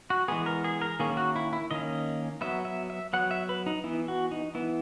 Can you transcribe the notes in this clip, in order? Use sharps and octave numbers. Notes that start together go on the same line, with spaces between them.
F#4
E3 G#3 B3 G#4
A#4
G#4
A#4
D#3 A#3 C#4 G#4
F#4
E4
E4
D#3 A#3 C#4 D#5
F#3 B3 E5
E5
E5
F#3 B3 F#5
E5
B4
D#4
E3 B3 E4
F#4
D#4
E3 B3 E4